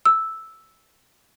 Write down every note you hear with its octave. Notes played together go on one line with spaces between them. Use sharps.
E6